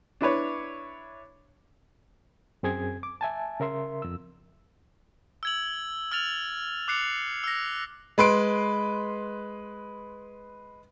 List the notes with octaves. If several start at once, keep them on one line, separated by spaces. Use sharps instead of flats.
D4 E4 B4 C#5
F#2 C4 G#4 G#6
D6
E5 G#5 A5
C#3 A#4 E5 C6
F2 E6
E6 G#6 F#7
E6 F6 A6 F7
D6 F#6 C7 C#7 F7
E6 A#6
G#3 B4 C6 D7